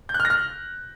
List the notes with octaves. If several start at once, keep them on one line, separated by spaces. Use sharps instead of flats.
G6
F#6
F6
A#6
F6